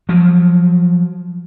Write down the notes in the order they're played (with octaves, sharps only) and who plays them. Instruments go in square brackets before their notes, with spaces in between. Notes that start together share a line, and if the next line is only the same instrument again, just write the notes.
[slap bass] F3 F#3